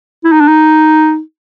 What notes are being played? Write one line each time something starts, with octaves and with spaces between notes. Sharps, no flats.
E4
D#4
D4
D#4